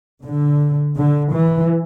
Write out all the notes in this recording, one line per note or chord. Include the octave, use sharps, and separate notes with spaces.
D3
D3
E3